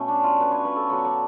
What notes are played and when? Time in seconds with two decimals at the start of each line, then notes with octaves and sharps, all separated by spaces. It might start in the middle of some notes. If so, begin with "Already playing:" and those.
Already playing: B2 A3 C#4
0.08 D4
0.23 F4
0.40 B4
0.52 C#5
0.65 B4
0.76 A4
0.89 D3 F#3 B3 C#5
1.05 D5